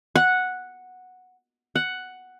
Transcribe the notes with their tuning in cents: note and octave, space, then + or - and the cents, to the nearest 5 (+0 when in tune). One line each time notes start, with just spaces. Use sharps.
F#5 -5
F#5 +5